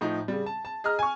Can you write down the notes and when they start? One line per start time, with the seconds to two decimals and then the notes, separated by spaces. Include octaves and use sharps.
0.01 A2 F3 D#4
0.28 C#3 G3
0.46 A5
0.65 A5
0.84 G#4 D#5 A#5 F6
0.99 G#5 C#6